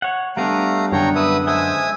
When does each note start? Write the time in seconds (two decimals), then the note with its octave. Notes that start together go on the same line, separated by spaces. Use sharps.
0.02 C#5 F#5
0.37 G3 A3 B3 D4 F5 A#5
0.92 F#2 D3 C#5 G5 A#5
1.15 B4 E5 D#6
1.47 G#3 C5 E5 G#5 A5 D#6